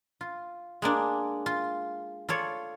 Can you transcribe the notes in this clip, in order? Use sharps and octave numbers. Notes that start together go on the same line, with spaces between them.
F4
G#3 A#3 D4
F4
F4 A4 C#5 D5